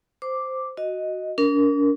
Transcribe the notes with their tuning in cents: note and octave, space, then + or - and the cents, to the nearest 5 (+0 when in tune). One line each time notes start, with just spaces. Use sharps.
C5 -5 D6 +0
F#4 +0 D#5 +0
D4 -45 A#4 +0